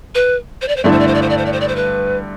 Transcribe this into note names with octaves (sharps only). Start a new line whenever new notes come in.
B4
C5
D5
C5
G2 D3 A3 E4 D5
C5
D5
C5
D5
C5
D5
C5
D5
C5
D5
C5
B4